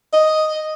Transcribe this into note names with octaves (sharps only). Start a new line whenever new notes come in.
D#5